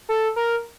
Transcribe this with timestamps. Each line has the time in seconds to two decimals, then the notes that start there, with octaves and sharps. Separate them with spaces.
0.09 A4
0.36 A#4